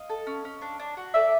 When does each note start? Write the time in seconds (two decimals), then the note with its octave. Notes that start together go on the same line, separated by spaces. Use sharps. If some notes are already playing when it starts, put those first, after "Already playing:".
Already playing: D#5 F5
0.09 A4
0.27 C#4
0.45 C#4
0.62 D4
0.80 D4
0.97 F#4
1.14 A4 D5 E5